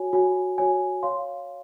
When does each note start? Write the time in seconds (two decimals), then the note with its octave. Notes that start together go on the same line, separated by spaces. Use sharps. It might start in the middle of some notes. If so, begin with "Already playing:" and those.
Already playing: F#4 C#5 G#5
0.13 F#4 C#5 G#5
0.58 F#4 C#5 G#5
1.03 C#5 F5 C6